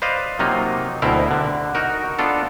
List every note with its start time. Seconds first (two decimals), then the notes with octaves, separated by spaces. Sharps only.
0.02 B4 C5 D5 D#5 F5
0.39 C3 F#3 A#3 D#4 F4
1.02 D2 B2 C4 E4 A#4
1.31 D3
1.75 D#4 F#4 A#4
2.19 B3 D4 F4 A4